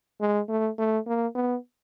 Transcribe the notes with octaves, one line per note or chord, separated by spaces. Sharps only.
G#3
A3
A3
A#3
B3